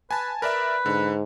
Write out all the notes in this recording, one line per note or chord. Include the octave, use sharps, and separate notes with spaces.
B4 G#5 A5
A#4 B4 D5 E5
G#2 D3